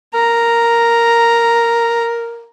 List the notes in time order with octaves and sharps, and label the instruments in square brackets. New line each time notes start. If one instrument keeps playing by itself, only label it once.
[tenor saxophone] A#4 [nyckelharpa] A#5